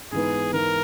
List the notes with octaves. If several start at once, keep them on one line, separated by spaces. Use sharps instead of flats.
G#2 E3 B3 G#4
G#2 E3 B3 A#4